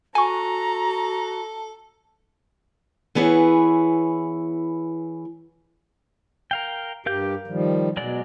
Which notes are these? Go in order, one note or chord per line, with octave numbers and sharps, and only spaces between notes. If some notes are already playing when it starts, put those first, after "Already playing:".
F#4 A4 G#5 A#5 C#6
E3 B3 E4 G#4 C#5
A#4 F5 G5
G2 G4 A#4 F5 G6
D#3 F3 G3
B2 F#3 G#3 D5